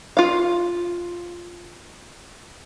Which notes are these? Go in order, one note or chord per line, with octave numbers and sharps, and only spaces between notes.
F4 F5